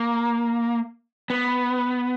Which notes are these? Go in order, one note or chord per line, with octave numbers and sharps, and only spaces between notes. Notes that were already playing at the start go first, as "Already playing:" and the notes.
Already playing: A#3
B3